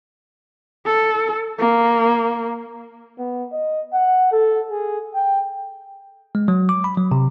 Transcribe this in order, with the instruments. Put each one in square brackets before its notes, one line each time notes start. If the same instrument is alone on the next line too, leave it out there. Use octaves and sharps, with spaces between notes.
[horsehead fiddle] A4
A#3
[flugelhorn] B3
D#5
F#5
A4
G#4
G5
[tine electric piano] G#3
F#3
D6
B5
F#3
C3